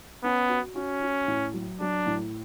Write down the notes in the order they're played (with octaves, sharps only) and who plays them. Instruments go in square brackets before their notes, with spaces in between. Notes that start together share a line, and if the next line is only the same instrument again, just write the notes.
[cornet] B3 [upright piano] C#4
[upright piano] F#4
[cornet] C#4 [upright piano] F#4
[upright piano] F#4
A2
F#3
[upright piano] F#3 [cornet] D4
[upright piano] A2